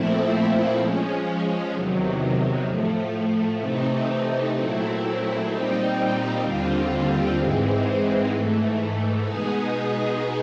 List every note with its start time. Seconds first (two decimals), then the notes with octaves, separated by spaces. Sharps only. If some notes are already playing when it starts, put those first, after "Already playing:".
Already playing: A#2 F3 A3 C4 E4
0.76 F3 G#3 C#4
1.71 E2 C3 D#3 F#3
2.64 A2 F3 A3
3.59 C3 E3 A3 C4 D#4
4.53 A#2 F#3 A3 C4 E4
5.47 A#2 G3 C4 D#4 G4
6.40 D#2 D3 G3 C4 F4
7.35 G#2 E3 G#3 C4
8.29 G#2 E3 A3
9.23 B2 G#3 B3 D#4 G#4